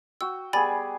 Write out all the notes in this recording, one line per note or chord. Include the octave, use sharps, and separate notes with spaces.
F#4 G5 E6
G3 B3 G#4 G#5 B5 A6